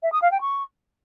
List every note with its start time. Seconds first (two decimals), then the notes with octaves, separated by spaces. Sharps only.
0.03 E5
0.12 D#6
0.22 F5
0.31 G5
0.41 C#6